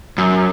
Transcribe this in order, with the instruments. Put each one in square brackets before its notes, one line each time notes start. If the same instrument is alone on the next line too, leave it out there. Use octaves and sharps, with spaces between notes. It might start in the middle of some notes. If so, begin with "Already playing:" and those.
[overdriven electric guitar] F#2